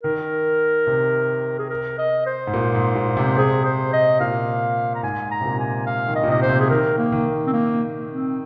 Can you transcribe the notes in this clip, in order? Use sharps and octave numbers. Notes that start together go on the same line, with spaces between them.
D#3 A#4
C3
G#4
A#4
D#5
C5
G#2
A#2
G#2
A#2
C3
C3 G#4
C5
D#5
A#2 F5
A#5
G#2 G#5
A#5
C3
A#2
G#5
F5
D#3
D#5
A#2
C3 D#5
C5
C3
G#4
D#3 A#4
A#3
D#3
C4
A#3
C4